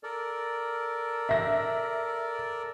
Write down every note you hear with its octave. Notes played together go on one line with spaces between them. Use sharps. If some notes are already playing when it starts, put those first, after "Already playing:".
A4 A#4 D5
E5 A#6